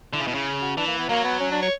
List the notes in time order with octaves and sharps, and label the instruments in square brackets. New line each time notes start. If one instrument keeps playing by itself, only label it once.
[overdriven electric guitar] D3 [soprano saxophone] E4
[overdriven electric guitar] C#3
B2
C#3
[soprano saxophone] F#4
[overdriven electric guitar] E3 [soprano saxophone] D4
[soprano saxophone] A#3
B3
[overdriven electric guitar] F#3 [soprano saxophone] A#3
[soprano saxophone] B3
C#4
D4
C#5